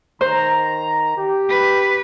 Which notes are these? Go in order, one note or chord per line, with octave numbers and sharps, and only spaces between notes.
D#3 C5 A#5
G4
B4